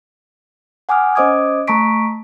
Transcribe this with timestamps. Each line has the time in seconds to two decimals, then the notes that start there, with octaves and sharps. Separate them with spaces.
0.89 F#5 G#5 D6 D#6 F6
1.15 C#4 C5 D#5 D6 D#6 G#6
1.67 A3 A5 A#5 C#6 B6 D7